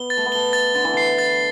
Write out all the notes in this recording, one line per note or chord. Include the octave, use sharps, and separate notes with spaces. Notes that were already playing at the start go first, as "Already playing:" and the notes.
Already playing: B3 G7
A6
A3
B3
A3 G7
A6
D3 A6
E3
D3 C7
A6